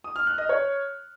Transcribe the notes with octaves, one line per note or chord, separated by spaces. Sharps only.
D#6
F6
F#6
D#5
C#5